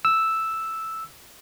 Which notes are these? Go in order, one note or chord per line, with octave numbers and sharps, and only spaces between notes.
E6